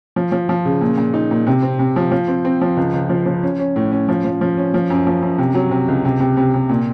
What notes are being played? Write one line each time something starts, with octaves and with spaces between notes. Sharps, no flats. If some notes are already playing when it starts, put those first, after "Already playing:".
F3
F3
F3
C#3
A#2
A#2
D#4
A#2
C3
C4
C3
F3
F3
C4
C4
F3
C#2
C#2
F3
F3
C#4
C#4
A2
C#4
F3
F3
F3
C#4
F3
F#2
F3
F#2
C3
F#3
C3
C#2
C3
C3
C3
C3
A#2